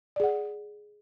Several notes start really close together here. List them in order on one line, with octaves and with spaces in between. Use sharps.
D5 G#4 F#5